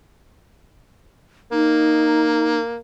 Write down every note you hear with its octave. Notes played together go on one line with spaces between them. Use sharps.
A#3 D#4